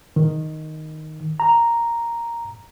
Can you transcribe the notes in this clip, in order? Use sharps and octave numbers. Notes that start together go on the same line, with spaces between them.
D#3
A#5